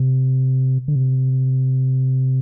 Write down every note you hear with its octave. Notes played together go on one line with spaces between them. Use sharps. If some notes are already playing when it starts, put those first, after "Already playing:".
Already playing: C3
D3
C3